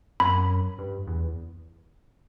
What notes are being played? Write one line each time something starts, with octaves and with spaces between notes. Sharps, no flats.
F#2 B5
G2
E2